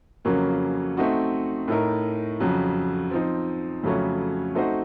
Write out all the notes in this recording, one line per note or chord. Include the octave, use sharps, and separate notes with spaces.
F2 C#3 F#3 A#3 C#4
A3 C4 D#4 F#4
A2 A3 D#4 A#4
F2 C#3 F#3
F3 C4 D#4
F2 C#3 F#3 A3 C#4
A3 C4 D#4 F#4 C5